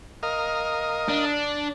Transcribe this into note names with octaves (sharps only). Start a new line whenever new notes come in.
A#4 D#5 F5
D4